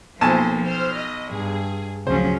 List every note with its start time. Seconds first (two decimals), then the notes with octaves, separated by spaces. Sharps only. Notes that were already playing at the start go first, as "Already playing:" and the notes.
0.21 B1 F3 A#3 C5 G#5 A5
0.66 C5 F6
0.97 D#5
1.31 G2 G#4
2.07 D2 C#3 F3 F#3 C#4 C5